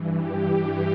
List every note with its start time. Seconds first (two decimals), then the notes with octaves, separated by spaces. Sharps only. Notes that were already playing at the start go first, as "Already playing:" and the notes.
Already playing: G2 E3
0.19 G4